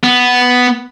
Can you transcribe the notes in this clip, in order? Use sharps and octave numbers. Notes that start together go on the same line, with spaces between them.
B3